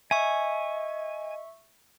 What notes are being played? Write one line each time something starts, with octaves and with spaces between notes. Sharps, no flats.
D#5 E5 G#5 C#6